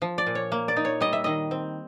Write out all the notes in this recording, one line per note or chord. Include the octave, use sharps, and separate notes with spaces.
F3
D5
A#2
C#5
A#3
D5
D#4
C#5
G3 D#5
E5
D#3 D#5
C4